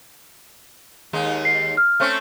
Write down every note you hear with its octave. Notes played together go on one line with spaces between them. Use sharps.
D#2 G#3 D#4
C7
F6
A3 C4 C#4